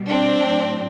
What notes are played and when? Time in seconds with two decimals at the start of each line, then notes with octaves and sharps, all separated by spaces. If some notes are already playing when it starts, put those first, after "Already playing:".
Already playing: B2 G3
0.09 C4 D4
0.43 A2 F#3